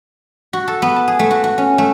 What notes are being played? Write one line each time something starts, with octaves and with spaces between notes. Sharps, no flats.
F#4
A4
B3
A5
G#4
A3
F#4
F#4
C#4
A3